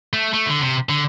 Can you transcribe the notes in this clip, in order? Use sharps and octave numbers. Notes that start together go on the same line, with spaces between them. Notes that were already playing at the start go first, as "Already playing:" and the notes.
A3
A3
D3
C3
D3